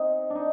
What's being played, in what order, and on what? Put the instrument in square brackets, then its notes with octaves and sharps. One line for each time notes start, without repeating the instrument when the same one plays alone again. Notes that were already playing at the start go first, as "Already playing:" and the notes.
Already playing: [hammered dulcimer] C4 D#4
D4
D#4